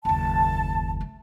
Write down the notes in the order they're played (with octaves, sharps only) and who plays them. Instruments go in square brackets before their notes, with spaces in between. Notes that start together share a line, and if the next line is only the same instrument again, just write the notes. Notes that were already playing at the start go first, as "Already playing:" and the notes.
[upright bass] F#1 D#2 [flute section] A5
[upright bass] A3